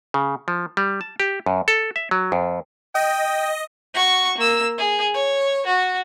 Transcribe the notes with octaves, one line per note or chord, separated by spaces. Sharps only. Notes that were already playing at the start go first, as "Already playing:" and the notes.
C#3
F3
G3
A5
G4
F#2
A4
E5
F#3
F2
D#5 G5
F#4 C#6
A#3 E6
G#4
C#5
F#4